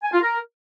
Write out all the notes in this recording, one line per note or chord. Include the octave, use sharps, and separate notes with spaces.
G#5
F4
A#4